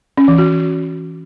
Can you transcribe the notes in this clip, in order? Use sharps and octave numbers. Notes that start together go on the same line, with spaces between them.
C#4
E3
F#4